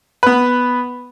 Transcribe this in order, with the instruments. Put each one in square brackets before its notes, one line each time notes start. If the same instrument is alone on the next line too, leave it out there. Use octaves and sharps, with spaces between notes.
[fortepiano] B3 B4